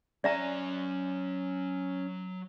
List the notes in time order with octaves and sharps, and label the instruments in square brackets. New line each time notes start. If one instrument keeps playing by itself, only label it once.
[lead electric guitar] F#3 G#5 [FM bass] C#4 [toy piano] D5 E5 A#5